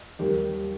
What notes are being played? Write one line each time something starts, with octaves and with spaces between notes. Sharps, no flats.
D#2 D#3 G3 G4